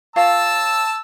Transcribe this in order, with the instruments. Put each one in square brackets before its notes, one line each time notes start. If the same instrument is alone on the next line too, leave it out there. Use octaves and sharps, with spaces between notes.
[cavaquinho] F4 A#4 C#5 [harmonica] A5 E6